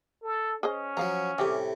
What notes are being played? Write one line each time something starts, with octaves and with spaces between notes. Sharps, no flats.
A4
C#4 G#4 C5 D#5
F3 F#3 F5 A#5
A2 C3 G3 G4 G#4